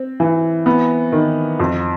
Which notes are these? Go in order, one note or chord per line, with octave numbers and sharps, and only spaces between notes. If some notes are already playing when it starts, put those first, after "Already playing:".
Already playing: C4
E3
B3
D#3
F2